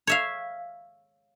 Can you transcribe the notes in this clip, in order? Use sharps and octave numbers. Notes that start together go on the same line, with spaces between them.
C#5 E5 F5